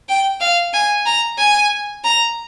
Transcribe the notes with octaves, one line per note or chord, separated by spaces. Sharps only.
G5
F5
G#5
A#5
G#5
A#5